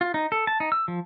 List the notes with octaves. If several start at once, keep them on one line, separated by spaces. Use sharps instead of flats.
F4
D#4
A4
A5
D#4
E6
F3